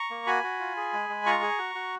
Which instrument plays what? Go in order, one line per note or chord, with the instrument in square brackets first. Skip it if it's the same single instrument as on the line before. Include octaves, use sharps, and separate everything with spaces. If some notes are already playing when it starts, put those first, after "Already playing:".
Already playing: [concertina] A#5 C#6
A#3
F#4 G#5 B5
F#4
F4
G#4
G#3
G#3
F4 A#5 C#6
G#4
F#4
F#4